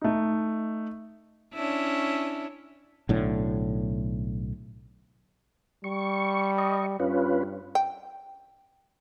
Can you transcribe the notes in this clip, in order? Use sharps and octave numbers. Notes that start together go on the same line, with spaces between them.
A3 D#4
C#4 D4 E4
B1 A2 D3
G3 C#6
D#5 C#6
G2 C#4 F4 B4
G5